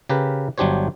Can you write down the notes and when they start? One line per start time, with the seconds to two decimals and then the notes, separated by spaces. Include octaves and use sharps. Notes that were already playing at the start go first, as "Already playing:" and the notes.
0.09 C#3 G4 A#4 B4
0.58 G1 F#3 D4 G4 C5 C#5